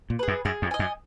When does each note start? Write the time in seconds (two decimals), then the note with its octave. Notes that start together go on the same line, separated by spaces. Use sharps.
0.10 A#2
0.19 G#4 B4
0.28 F#2
0.45 F#2 G#4
0.62 F2
0.71 D#5 G#5
0.79 F#2